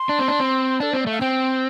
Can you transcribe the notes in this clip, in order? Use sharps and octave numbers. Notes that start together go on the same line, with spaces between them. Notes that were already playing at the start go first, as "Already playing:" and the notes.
Already playing: C6
D4
C4
D4
C4
D4 A4
C4 C5
D5
A3 F5
C4 G5